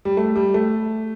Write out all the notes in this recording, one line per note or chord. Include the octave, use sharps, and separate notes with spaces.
G3
A3
G3
A3